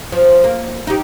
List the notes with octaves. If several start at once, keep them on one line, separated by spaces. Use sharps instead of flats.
F3
A#3
D#4 G4